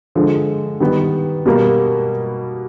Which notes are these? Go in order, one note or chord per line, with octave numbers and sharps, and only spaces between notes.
D3 F3 G#3
D#3 G3 B3
B2 G3 A#3